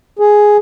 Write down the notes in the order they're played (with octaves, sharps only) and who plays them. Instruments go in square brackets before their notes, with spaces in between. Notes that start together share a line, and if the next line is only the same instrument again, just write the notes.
[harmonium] G#4